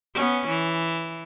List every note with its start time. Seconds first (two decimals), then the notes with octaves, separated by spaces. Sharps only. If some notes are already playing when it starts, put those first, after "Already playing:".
0.14 B3 C#4
0.48 E3